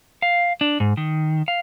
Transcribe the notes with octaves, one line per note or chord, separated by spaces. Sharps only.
F5
D4
G#2
D#3
F5